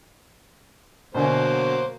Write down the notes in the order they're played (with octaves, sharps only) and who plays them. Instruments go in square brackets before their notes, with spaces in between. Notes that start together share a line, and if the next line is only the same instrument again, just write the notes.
[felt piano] B2 D3 G#5 [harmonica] F#3 A#3 C5